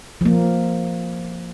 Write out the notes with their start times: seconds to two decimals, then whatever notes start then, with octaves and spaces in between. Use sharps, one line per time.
0.21 F3 A#3